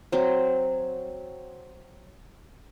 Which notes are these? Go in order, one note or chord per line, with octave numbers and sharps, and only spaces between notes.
F#3 C4